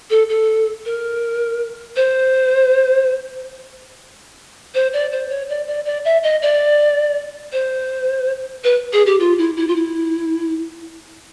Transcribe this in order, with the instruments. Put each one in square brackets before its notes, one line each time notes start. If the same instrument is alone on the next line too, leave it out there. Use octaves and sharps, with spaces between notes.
[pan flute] A4
A4
A#4
C5
C5
D5
C5
C#5
D5
D5
D5
E5
D#5
D5
C5
B4
G#4
G4
F4
E4
E4
F4
E4